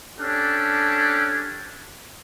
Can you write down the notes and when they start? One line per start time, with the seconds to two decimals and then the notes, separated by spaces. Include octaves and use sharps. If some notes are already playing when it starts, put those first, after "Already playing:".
0.19 C#4 D4 G4 A4